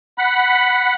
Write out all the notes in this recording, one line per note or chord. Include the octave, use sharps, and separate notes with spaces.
F#5 B5